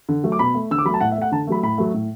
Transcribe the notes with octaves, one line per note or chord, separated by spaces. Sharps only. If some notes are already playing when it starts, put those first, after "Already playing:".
D3
F#3 A3
D6
B2 B5
A3
D3 E6
D6
F#3 A3 B5
A5
A2 F#5
E5
A3 F#5
D3 A5
F#3 A3 B5
A2 B5
F#3 A3
A2